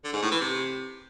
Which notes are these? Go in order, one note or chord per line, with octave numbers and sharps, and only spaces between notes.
D3
G#2
A2
E3
C3